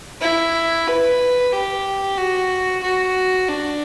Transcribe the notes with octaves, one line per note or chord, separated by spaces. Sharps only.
E4
B4
G4
F#4
F#4
D4